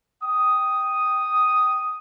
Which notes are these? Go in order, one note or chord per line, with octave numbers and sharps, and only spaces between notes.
G5 D#6